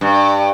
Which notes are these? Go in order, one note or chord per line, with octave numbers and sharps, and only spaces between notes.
G2